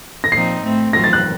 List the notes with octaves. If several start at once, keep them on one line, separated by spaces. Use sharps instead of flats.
A#6
A#2 F3 C4 D#4 C7
A2 A3 C4
A2 F#3 A3 C4 F4 A#6
A6
F#6